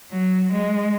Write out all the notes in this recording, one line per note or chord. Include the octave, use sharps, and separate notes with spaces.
F#3
G#3